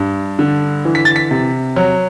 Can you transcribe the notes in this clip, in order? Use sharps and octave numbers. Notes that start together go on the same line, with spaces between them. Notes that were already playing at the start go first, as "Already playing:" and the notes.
Already playing: G2
D3
E3
B6
A6
B6
C3
F#3